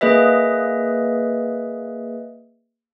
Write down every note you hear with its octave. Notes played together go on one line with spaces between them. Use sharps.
A#3 G#4 B4 D#5 E5